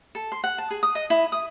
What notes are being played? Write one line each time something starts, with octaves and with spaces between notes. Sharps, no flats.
A4
C6
F#5
A5
G#4
D#6
D#5
E4
D#6